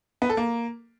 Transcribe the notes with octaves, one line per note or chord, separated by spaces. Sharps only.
B3
A4
A#3